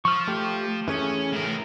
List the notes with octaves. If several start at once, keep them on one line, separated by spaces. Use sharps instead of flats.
F3 C#6 F6
A3 G4
E3 A3 C#4 G#4
A2 A#4